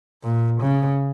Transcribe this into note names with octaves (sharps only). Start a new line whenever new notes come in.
A#2
C#3